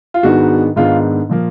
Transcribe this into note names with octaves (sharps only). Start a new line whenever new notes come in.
F4
G#2 D#3 G#3 B3 D4 F#4
G#2 D#3 G#3 B3 D4 F4
A#2 F3 A#3